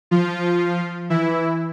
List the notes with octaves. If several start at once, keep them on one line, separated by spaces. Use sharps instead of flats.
F3 F4
E3 E4